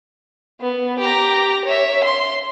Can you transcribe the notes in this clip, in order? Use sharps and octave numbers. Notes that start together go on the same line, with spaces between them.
B3
G4 A#5
C#5 E5
C6